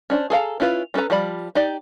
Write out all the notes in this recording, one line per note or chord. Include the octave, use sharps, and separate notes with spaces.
C#4 D4 C5
G#4 A4 F5 A#5
C#4 E4 F4 B4
G3 C#4 A4 B4 A#5
F3 G3 D5 B5
D#4 G4 D5